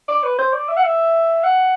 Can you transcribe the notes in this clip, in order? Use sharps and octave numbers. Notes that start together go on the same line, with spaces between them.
D5
B4
C5
D5
E5
F#5
E5
F#5